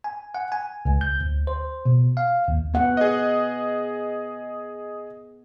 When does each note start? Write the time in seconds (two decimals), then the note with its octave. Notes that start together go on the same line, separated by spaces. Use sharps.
0.04 G#5
0.35 F#5
0.52 G#5
0.85 C#2
1.01 G6
1.21 D2
1.47 C5
1.86 B2
2.17 F5
2.48 D#2
2.74 B3 F#5
2.97 G#4 D#5